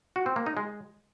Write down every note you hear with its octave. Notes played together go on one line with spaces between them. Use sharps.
F#4
C4
A#3
D#4
G#3